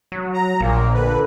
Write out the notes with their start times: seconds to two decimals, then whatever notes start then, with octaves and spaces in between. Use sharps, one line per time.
0.12 F#3
0.34 A#5
0.61 A#1 A#2 A#3
0.94 D3 B4